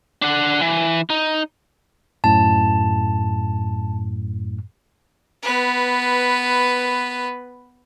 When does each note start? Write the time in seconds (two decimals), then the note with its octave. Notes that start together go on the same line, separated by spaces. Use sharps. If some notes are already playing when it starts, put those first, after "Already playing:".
0.22 D4 F#5
0.61 E3
1.10 D#4
2.24 F#2 A2 A5
5.43 B3 B4